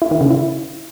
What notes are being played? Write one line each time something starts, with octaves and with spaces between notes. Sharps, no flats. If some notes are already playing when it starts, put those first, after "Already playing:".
E4
D#3
C#3
E4